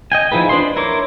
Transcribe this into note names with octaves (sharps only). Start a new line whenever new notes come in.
D#5 G5 G#5
F3 D#4 E4 G#4 B4
D4 B4 C5 D#5 C6
E4 A#4 C#5 C6 D6